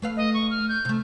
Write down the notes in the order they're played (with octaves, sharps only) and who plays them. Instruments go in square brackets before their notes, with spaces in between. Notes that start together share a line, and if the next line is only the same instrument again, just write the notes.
[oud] A3 B4 F5
[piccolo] D#5
C#6
F6
G6
[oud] C3 A3